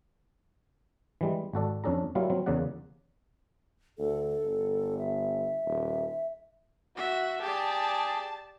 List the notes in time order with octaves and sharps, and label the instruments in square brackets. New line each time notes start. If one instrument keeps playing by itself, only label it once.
[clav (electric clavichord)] E3 G3 G#3
G#1 F#4 A4 D5
F2 C#4 D4 A4 A#5
F#3 G3 A#3 E4 F4
F#3 C4
E2 C#3 A#3 D5 F#5
[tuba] D2 [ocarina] A4
[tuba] G1
[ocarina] E5
[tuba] D#1
[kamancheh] F#4 [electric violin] E5
[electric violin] G4 D5 [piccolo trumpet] G#4 [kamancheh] A5